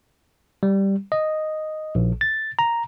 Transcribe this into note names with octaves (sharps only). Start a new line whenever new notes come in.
G3
D#5
A#1
A6
A#5